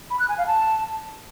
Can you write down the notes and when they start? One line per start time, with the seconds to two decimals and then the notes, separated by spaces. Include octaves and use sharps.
0.10 B5
0.20 F#6
0.29 G#5
0.38 F5
0.47 A5